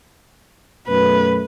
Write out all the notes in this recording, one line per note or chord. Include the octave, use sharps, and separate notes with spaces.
F#2 B2 A3 B4